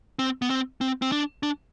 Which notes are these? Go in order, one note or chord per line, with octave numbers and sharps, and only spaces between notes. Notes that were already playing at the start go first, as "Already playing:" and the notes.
C4
B3
C4
C4
C4
D4
D4